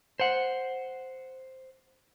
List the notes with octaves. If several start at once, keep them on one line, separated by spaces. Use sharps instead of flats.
C5 F#5